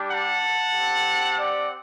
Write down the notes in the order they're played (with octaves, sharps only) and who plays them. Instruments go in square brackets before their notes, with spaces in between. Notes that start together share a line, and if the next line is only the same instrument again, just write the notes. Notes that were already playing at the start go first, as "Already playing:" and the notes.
Already playing: [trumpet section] G3 D4 G4
F#5 A5
C4 G4
D5 F#5